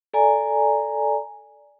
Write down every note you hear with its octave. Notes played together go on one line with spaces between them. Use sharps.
A4 D5 G#5 A#5